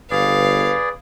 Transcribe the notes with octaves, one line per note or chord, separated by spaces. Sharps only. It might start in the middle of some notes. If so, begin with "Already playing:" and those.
G1 G#4 B4 D5 F5